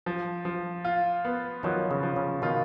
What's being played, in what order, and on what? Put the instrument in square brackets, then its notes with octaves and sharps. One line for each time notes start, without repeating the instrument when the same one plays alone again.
[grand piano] F3
F3
F4
B3
[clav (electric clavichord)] D#3 F#3 [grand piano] F3
[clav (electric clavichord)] C#3
[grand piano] F3
[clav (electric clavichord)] C#3
[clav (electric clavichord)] B2 D#3 [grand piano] F4